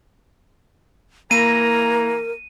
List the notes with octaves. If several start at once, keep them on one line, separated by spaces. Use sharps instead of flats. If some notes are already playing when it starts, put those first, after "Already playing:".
E3 A#3 A#4 G#5 A#5 A#6 D#7